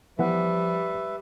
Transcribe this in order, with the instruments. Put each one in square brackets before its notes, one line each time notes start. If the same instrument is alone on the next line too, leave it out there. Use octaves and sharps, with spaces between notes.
[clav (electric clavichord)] E3 B3 F#5 [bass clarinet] F3 [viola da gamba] G3 [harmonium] B4 E5